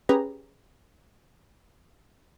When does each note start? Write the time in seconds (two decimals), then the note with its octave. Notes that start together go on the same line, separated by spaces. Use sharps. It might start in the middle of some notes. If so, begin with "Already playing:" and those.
0.09 C#4 G4 G#4 B4 A#5